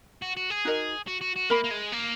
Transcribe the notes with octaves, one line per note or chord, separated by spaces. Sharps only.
F#4
F#4
G#4
D#4 F#4 A#4 D#5
F#4
F#4
F#4
A#3 A#4 E5 B5
A#3
G#3
A#3